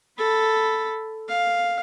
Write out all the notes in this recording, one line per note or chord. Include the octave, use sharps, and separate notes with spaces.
A4 B5
F5